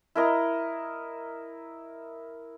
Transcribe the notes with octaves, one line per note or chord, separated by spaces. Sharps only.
E4 A#4 D#5 A#5